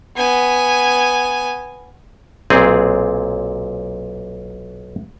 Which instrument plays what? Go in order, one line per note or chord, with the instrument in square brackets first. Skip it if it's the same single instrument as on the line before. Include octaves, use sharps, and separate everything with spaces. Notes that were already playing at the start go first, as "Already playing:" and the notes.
[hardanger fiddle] B3 G#5
[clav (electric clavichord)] B1 A#2 C4 G#4